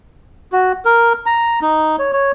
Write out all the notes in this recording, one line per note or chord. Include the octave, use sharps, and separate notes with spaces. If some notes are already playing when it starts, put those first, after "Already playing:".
F#4
A#4
A#5
D#4
C#5
C#5